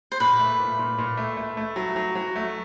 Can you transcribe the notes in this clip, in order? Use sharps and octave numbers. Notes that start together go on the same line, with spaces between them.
C5
A#2 B4
A3
A#2
A#2
A#2
A3
A3
A3
F#3
F#3
F#3
A3